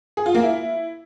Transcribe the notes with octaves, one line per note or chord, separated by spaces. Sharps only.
G#4
F4
A#3
E4